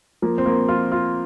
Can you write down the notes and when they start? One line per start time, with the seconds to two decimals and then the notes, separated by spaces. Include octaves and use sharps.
0.22 F3 A#3
0.38 C4
0.46 A#3
0.68 F3 F4
0.92 F4